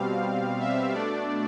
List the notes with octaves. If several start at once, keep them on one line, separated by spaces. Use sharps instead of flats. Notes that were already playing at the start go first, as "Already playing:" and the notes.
Already playing: B2 G3 C4 F5
E5
B2 A3 D4 D5